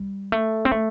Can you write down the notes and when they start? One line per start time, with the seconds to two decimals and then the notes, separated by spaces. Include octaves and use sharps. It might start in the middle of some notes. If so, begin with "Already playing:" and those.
Already playing: G3
0.32 A3
0.65 C4
0.72 A3